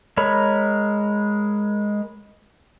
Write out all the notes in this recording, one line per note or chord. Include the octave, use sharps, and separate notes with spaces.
G#3 A#4 C#5 B5